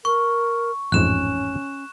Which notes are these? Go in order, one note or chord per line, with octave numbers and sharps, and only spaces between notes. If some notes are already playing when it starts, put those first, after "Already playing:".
A#4 C#6
A1 F2 G#2 C#4 F#6 E7